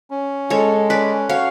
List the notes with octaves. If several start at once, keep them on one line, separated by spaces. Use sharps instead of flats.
C#4
G#3 A4 C#5
C#4 B4 D5
F#4 C#5 F5